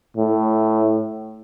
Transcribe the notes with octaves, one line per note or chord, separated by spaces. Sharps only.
A2